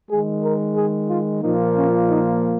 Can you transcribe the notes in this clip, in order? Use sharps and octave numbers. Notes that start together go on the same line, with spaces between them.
D#3 G#3 G#4
A#4
G#4
F4
A#2 F3 A#3 D#4
C#4
D#4